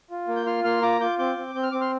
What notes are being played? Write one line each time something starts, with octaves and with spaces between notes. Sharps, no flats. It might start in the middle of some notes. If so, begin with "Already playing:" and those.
F4
A#3
G6
F4 C6 F6
A#3 C6 F6
F4 A#5 D6
F4 D6 G6
C4 D6 G6
C4
C4 G6
F6
C4 D6
C6 F6